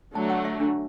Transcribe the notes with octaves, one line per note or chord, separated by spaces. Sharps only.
D3 F#3 A3 A5
F#5
E5
D4